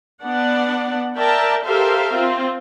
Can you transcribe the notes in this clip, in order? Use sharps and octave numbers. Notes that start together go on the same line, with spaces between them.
B3 D4 D5 F#5
A#4 D5 E5 G5 A5 A#5
G4 A4 A#4 C5 E5 F5
C4 F4